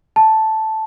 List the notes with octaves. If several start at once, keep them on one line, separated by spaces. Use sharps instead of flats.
A5